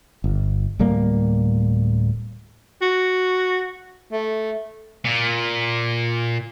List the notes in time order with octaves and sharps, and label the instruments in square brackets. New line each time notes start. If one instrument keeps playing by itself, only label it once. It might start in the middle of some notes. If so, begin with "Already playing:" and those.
[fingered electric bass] G1
D1 A2 G3 A#3
[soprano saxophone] F#4
A3
[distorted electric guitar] A#2